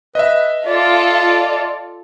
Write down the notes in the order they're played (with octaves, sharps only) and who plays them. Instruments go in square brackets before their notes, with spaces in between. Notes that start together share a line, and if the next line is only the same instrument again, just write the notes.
[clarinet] B4 [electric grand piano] D#5 E5
[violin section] F4 A4 [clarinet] D5